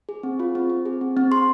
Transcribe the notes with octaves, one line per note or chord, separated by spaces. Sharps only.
G#4
C4
F4
C4
C4
G#4
C4
C4
G#4 C6